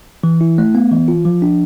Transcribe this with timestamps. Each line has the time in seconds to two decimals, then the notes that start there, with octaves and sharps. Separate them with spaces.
0.24 E3
0.41 E4
0.58 A3
0.75 B3
0.91 E3
1.08 F4
1.25 F3
1.42 D4